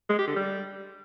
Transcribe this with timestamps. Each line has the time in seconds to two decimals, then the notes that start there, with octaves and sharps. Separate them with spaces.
0.10 G#3
0.18 G4
0.27 D3
0.36 G3